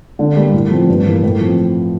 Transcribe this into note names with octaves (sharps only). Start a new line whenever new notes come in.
D3
G3 A#3
A2
F3 C4
G2
E3 A#3
A2
F3 C4